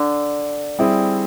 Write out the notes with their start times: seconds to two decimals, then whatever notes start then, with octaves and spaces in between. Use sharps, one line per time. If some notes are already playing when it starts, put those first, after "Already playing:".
Already playing: D3
0.79 G3 C4 E4 G#4